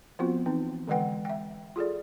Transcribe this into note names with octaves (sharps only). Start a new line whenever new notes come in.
F3 B3 C4 F4 F#4
E3 C4 D#4
D3 E3 G#3 B4 F#5 G5
E5 G5
F4 G#4 A4 D5